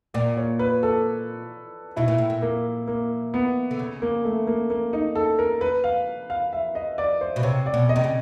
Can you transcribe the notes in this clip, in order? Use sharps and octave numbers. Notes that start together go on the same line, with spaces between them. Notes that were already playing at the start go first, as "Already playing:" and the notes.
A#2 D5
C#5
B4
A4
B2 E4
A#2
A2
A#2
A#3
A#3
B3
D3
C#3
A#3
A3
A#3
A#3
D#4
A4
A#4
B4
F5
F5
E5
D#5
D5
C5
B2
C3 C#5
D5
B2
D#5
C3
C#3